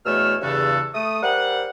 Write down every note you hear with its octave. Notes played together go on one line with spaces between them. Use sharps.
E2 B2 A3 C#5 E6 F6
E2 G2 C#3 E3 F#4 A4
A3 D#6
G3 A#4 C5 F#5